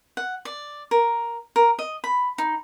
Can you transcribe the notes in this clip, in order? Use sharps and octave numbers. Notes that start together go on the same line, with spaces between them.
F#5
D5
A#4
A#4
D#5
B5
D#4